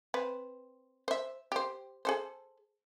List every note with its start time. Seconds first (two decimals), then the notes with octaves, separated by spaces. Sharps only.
0.14 C4 B4
1.08 C5 E5
1.52 G4 C5
2.05 G#4 A4 C5